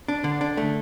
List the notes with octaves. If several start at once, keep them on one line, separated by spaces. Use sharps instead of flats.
D4
D3
D4
A3